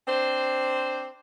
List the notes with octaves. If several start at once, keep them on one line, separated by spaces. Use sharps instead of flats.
C4 D4 C5